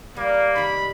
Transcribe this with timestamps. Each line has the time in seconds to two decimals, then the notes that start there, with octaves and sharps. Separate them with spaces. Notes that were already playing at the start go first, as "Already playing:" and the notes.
0.16 G3 A#3
0.56 C3 D#3 B5